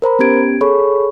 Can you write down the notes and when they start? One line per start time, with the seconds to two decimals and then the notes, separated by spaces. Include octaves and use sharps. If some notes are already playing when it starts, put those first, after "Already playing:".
0.02 A#4 C5 A#5 B5
0.19 B3 C#4 G4 G#6 D7
0.61 G#4 A4 C#5 B5 C#6